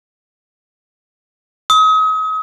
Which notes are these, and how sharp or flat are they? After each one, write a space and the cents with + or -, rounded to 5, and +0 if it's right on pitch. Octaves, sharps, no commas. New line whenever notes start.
D#6 +35